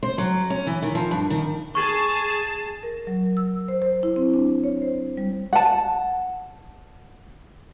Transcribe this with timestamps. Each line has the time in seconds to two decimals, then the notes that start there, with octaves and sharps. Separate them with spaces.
0.03 C5
0.18 F#3
0.50 C#4
0.67 E3
0.83 D#3
0.95 F3
1.11 G2
1.30 D#3
1.75 G#4 A5 C#6
2.83 A#4
3.07 F#3
3.37 E6
3.68 C5
3.82 C5
4.03 E4
4.16 C4
4.34 D4
4.64 C#5
4.82 C5
5.17 G3
5.53 F#5 A5